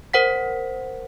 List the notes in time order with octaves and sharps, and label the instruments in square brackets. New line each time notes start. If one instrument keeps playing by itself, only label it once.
[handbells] A#4 C5 F#5 B6